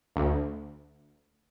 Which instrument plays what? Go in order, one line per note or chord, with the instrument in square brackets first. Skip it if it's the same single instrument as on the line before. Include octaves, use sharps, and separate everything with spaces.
[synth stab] D2